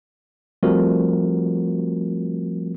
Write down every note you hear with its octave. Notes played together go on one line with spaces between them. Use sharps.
F3 G3 A3 C4 F#4 A#4